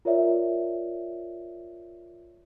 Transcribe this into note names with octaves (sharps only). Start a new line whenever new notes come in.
F4 A#4 C#5 D5 E5